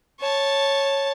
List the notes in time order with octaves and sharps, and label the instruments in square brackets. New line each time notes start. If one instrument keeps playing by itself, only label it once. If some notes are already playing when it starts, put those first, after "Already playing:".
[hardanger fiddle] C#5 A5